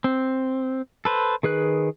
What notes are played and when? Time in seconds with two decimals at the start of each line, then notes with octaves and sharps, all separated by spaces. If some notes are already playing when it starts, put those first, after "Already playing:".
0.04 C4
1.05 A4 B4 C5
1.43 D#3 G#4 B4 F#6